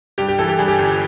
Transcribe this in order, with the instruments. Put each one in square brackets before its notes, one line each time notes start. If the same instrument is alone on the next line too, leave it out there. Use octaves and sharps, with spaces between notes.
[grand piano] G2 G4
G4
E3 A4
G4
G2 G#4
G4
G1